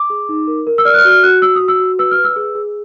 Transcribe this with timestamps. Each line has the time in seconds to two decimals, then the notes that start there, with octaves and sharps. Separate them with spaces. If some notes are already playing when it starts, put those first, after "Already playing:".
Already playing: D6
0.10 G#4
0.29 D#4
0.47 A#4
0.67 A#4
0.78 E6
0.85 D5 F6
0.94 F#6
0.98 F6
1.05 F#4
1.10 F6
1.23 F#4 F#6
1.42 F#4 E6
1.55 D#6
1.61 F#4
1.68 E6
1.80 F#4
1.99 B4 E6
2.11 F6
2.18 B4
2.24 E6
2.36 G#4
2.55 G#4